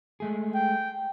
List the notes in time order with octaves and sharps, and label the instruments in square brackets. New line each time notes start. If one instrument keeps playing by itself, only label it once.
[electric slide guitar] G#3 A3 G#4
[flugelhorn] G5